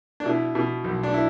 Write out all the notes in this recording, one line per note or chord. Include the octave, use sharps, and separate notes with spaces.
D4
B2 E4
B2
B1
D4
E4